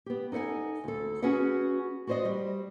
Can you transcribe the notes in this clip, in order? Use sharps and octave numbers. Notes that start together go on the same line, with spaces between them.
B3 G4
D#4 A4 B4 F#5 G#5
D2 A4
C#4 F#4 G#4 B4 F#5
F#4 B4 C5 D5 D#5
G3